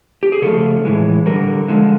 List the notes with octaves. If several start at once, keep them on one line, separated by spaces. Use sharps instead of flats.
G4
G#4
C#3 F3 A3 A4
A2 E3 G#3
D3 G3 A#4
D3 F3 G#3